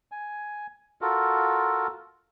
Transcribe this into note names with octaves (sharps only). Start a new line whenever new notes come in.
G#5
F4 F#4 A4 A#4